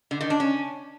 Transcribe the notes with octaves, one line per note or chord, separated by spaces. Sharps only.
D3
D#3
D4
C#4